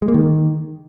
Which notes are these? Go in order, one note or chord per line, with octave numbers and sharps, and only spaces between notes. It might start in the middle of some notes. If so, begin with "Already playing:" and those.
G#3
A#3
D#3